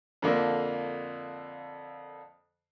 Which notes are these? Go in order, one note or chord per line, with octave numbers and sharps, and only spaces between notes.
F2 D3 A#3